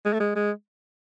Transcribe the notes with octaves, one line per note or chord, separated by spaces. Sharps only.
G#3
A3
G#3
G#3